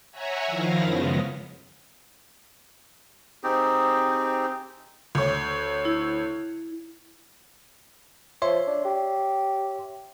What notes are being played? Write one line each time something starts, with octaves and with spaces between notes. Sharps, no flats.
C#5 E5 F#5 G#5 A#5
D#3 F3 E4 F5 A#6
F#2 C#3 F3 G#3 B3
C4 D#4 G4 G#4
D2 C#5
E4
F3 C#5 E5 C6
D4
G4